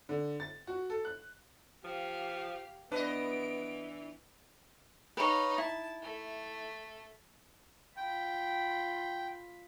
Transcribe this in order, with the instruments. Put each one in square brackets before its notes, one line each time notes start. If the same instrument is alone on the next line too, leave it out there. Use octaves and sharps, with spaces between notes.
[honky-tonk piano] D3
A6
F#4
A4
F#6
[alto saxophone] F3 [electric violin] G4 F5
[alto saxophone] E3 [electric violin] B3 D7 [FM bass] D4 [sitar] B4 D#5
[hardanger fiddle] D#4 F5 [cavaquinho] B4 C#5
[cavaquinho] E4 [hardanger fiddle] A5
[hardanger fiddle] A3
[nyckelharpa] F4 B5 [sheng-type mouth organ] G5